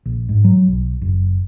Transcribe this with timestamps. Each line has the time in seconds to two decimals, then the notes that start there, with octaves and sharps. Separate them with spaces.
0.06 A#1
0.29 G#2
0.44 F#3
0.68 B1
1.02 F#1